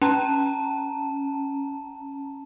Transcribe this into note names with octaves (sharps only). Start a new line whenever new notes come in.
C#4 A5 A#5